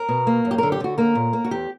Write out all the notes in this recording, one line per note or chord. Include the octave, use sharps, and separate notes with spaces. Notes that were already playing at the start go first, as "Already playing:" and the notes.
Already playing: A#4
B2
A#3
F#2
G4
D3 A#4
G4
D3 F#4
A#3 A#4
A#2
A#3
F#4
E2 G4